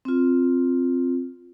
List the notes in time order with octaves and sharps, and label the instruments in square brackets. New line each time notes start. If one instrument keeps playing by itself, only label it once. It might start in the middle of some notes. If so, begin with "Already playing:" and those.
[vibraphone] C4 F4